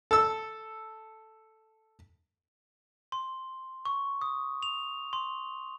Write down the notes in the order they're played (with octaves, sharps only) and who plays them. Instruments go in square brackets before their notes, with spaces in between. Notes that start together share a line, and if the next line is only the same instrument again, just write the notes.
[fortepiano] A4 E6
[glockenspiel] C6
C#6
D#6
F7
C6